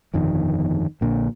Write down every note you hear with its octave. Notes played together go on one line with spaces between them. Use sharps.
G1 F2 B2 D#3
A#1 A#2 D3